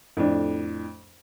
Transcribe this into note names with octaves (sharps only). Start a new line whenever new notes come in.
F2 A2 D4